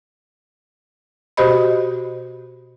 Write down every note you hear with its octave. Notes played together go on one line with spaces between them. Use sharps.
B2 F#4 G4 C5 D#5 B5